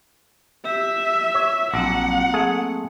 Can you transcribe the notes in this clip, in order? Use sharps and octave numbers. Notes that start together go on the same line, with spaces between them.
G4 E5
C#5
A#1 F#3 A#3 C4 F#5
A3 G#4